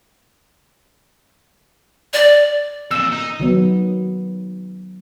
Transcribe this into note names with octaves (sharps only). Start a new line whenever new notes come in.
D5
F2 A#2 E6
D#4
D#3 F#3 B3